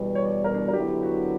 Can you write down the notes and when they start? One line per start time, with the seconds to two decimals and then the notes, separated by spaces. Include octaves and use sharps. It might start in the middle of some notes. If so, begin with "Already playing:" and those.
Already playing: E2 B2 G3
0.15 C#5
0.25 D5
0.44 A#4
0.54 D4
0.68 A#4
0.73 D3 F#3 B3 E4 G4
1.03 F#4